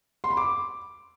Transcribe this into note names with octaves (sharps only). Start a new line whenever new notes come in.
C6
B5
D6